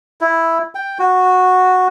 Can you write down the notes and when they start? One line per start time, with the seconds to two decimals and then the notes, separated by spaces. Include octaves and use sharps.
0.21 E4
0.75 G5
0.99 F#4